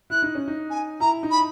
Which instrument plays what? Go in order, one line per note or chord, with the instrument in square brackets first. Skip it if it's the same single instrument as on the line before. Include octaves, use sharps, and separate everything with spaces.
[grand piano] E4 [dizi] F#6
[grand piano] D#4
C#4
D#4
[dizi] G#5
[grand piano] E4 [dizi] A#5
[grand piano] D#4
[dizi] B5